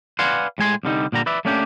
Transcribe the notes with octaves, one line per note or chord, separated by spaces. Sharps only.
B4 D5 F5 F#5 G#5 C6
A2 G#3 G#5 C6
C2 D3 G3 D#4
A#2 D3 G3 A#5
B4 D5 E5
A3 A#3 C#4 D4 G4